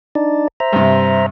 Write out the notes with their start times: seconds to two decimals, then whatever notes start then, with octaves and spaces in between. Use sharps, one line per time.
0.15 D4 D#4 D5
0.60 C5 E5 A#5
0.73 G2 C3